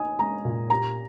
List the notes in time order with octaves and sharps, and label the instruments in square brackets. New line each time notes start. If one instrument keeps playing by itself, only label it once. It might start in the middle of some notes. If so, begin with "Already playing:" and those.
Already playing: [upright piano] D#4 [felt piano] G#5 D#6
[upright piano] G#3 [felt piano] A#5
[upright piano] A#2
[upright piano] G4 [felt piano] A#5